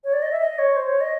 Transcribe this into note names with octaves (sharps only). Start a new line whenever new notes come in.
C#5
D5
D#5
E5
D#5
C#5
C5
C#5
D#5